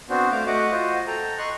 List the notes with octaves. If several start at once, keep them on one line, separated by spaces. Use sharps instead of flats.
B3 C4 D4 F#4 C5
A3 C5 F5 D6
A3 F#4 D#5 F#5 D6
F4 F#4 C5 D#5
A4 G5 A#5
D#5 C6 C#6 F#6